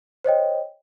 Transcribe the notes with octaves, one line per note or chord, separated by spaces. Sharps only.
C5 C#5 D#5 G5